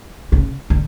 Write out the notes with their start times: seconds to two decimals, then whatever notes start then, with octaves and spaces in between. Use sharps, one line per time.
0.32 C#3
0.70 D3